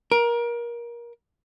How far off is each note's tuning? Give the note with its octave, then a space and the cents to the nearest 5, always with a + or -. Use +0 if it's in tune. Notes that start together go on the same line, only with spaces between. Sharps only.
A#4 +25